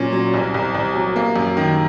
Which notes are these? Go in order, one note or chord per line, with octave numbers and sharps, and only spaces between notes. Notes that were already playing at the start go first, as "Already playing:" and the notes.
Already playing: A#2 F#3 C#4
F#3
C2
C2
C2
F#3
A#3
F#2
D#3